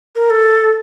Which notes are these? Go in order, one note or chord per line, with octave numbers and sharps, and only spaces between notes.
A#4
A4